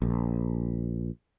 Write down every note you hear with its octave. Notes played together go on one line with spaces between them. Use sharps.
A#1